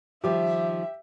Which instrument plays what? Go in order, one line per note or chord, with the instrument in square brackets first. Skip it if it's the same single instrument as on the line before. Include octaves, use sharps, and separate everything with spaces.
[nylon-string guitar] D#3 F3 G3 [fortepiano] G4 [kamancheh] E5